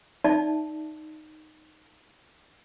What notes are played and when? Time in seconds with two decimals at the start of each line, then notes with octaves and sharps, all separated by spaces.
0.24 D#4 D5 E5 A5